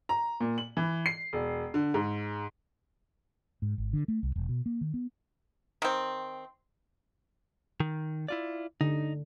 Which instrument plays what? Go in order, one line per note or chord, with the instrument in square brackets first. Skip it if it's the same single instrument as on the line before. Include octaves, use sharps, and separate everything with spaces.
[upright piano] A#5
A#2
F#7
E3
C7
E1
D3
G#2
[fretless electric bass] G#2
G#1
D3
A3
C2
E1
B2
A#3
D#3
B3
[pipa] D#3 C4
[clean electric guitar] D#3
E4 F4 D5
[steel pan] D3 [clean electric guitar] D#4